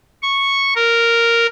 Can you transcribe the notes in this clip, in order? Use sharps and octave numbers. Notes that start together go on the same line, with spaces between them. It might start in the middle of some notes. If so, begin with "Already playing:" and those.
C#6
A#4